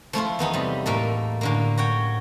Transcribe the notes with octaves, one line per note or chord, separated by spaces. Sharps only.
F3 A3 E4 F4
E2 B3 D#4 B5
C3 G3
A2 A#3 A4
A2 D3 A#3
F#4 C#5 G5